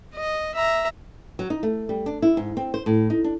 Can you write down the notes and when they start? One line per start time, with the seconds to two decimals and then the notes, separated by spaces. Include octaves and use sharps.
0.15 D#5
0.55 E5 A#5
1.39 F#3
1.50 D#4
1.63 A3
1.89 G3
2.06 D4
2.22 E4
2.37 G#2
2.57 C4
2.74 C5
2.86 A2
3.10 D#4
3.24 D4